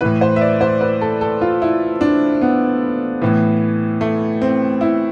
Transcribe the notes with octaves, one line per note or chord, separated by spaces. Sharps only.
A2 E3 B4
C5
E5
D5
C5
B4
A4
A4
F4
E4
D4
B3
A2 E3
A3
C4
E4